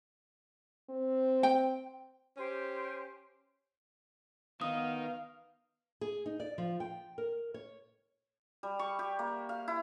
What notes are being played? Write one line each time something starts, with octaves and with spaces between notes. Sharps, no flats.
C4
G5
C#4 G4 C5
D#3 B3 D#4 F5 D#6
G#4
D#4
D5
F3
G5
A#4
C#5
G3
C#6
G4
A#3
F5
E4